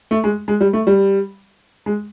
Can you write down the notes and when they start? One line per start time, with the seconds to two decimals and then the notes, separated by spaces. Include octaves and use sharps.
0.11 A3
0.24 G#3
0.48 G#3
0.60 G3
0.73 A3
0.87 G3
1.86 G#3